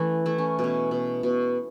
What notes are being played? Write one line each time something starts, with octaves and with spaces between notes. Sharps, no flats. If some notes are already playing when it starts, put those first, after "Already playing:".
Already playing: E3 A3 C#4 E4
A3 E4
C#4
B2
C#4
B2
B2